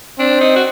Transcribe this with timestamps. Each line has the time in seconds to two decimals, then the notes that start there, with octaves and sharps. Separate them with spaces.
0.19 C4 D4
0.41 D#4
0.56 F#4